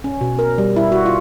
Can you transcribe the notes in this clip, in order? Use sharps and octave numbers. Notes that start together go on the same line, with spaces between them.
C#4
B2
A#4
G3
E4
F#4
F4